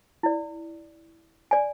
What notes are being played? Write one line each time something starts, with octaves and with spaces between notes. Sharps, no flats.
E4 D5
D5 G#5